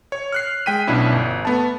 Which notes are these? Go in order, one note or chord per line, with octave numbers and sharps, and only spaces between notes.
C#5
F6 F#6 C7
G#3 G5 B6 D#7
B1 B2 C#4 D4 E4 B6
G1
A3 B3 A5